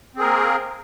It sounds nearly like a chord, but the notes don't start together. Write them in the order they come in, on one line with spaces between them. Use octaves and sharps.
C4 G#4 A#4 A#3